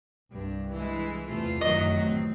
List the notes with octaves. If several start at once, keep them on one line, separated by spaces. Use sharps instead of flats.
C2 G2
E3 G#3 E4
E2 C3 A3 F4
A1 F#2 D#3 F#3 D#4 D#5
A2 C4